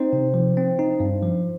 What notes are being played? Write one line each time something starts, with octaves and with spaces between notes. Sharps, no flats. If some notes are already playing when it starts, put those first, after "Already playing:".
Already playing: C4 D#4 C5
C3
F3
C4
D#4
G2
F3